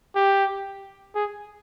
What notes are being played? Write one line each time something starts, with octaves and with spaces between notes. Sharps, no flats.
G4
G#4